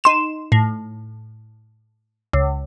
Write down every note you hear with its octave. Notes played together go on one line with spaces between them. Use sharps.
D#4 C6 E7
A2
C#2